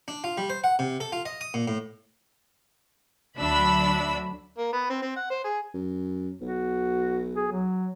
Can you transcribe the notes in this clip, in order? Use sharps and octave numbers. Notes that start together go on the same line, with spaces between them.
D4
F4
G3
C5
F#5
C3
A4
F4
D#5
D#6
A#2
A2
D2 F#3 D4 E5 B5 E6
A#3
B3
C4
C4
F#5
C5
G#4
F#2
B1 F#4
G#4
F#3